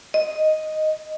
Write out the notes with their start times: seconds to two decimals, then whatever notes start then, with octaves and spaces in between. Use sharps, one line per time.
0.14 D#5